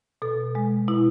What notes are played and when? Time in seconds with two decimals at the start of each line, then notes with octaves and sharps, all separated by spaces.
0.22 B2 A4
0.55 G#3
0.88 B2 E4